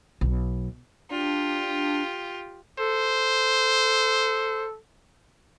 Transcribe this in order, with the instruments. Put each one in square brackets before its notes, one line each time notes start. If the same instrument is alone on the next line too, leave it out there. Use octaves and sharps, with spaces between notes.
[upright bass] B1
[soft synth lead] D4 [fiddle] F4 G4
[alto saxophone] A4 [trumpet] C5